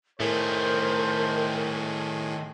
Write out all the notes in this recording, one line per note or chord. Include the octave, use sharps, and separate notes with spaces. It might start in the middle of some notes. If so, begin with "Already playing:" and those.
A2 D#3 A3 G#4 A#4 C5